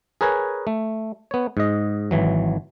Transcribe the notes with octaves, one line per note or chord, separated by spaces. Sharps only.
G#4 A#4 B4 C#5 G#5
A3
B3 C#5
G#2 D#5
G#1 E3 F#3